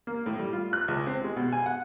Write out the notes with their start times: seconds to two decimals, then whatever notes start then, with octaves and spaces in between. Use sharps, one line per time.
0.07 A#3
0.26 A2
0.39 G3
0.53 F4
0.73 F#6
0.88 C#2
1.07 C4
1.24 G#3
1.36 B2
1.53 G#5
1.66 F#5